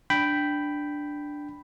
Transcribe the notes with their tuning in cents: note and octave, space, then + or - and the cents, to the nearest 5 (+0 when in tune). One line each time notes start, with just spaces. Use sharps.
D4 +0 G5 -5 B5 +5